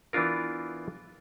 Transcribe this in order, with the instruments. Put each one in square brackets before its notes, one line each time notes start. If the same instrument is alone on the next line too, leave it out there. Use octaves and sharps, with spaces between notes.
[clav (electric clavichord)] E3 B3 D4 F4 A#4